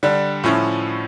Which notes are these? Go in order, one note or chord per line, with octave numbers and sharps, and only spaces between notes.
D3 G3 D4
A2 F3 C#4 E4